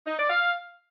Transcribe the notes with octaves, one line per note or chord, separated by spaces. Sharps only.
D#4
D5
F5